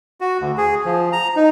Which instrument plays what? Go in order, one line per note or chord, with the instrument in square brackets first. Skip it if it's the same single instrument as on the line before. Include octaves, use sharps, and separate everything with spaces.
[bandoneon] F#4
D2
G#4
F3
A#5
D#4